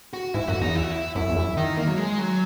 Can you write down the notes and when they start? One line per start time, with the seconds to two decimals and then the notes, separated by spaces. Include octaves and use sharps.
0.13 F#4
0.34 G#2 E4
0.48 F#2 F#4
0.61 E2 D#4
0.75 E4
0.83 F#4
0.91 E4
1.16 F#2 E4
1.29 E2
1.36 F#2
1.57 D#3 D#4
1.77 A#3
1.87 F#3
1.98 G#3
2.19 F#3